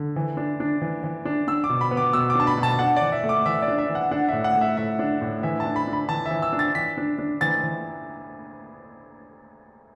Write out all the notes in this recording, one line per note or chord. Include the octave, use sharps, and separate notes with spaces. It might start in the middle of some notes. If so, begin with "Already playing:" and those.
Already playing: D3
E3
D4
D4
E3
E3
D4
D4 E6
D6
B2
B5
B3
D6
B2 E6
D6
D4 A5
B5
B2
A5
D4 F#5
D5
E3
E5
A3
D6
E3 E5
D5
D4
E5
E3
F#5
D4 F#5
A2 E5
F#5
A3
E5
A2 E5
D4
A2
E3 E5
A5
D4
B5
D4
B5
E3 A5
E5
E3
E6
D4
A6
E3 B6
D4
D4
E3 A6
E3